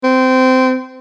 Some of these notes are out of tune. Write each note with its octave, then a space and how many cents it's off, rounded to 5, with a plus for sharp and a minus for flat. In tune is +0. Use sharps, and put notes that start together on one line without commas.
C4 -20